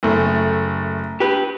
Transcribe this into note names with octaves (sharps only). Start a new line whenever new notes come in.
F#1 A3
G4 B4